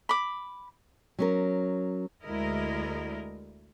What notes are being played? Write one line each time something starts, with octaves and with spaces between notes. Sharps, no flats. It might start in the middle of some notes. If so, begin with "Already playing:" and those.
B5 D6
F#3 C#4 A#4
D2 D3 G#3 E4 A#4 D#5